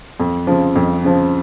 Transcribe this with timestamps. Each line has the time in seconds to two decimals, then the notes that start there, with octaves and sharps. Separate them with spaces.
0.20 F2
0.47 C#3 F3
0.76 F2
1.04 C#3 F3